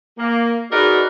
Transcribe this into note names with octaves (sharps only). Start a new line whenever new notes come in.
A#3
D#4 F#4 G#4 A#4 B4 D5